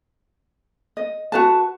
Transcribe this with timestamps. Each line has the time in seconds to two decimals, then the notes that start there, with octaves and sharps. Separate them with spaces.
0.97 D#5
1.32 F#4 B4 A5